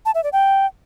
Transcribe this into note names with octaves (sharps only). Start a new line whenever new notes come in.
A5
E5
D5
G5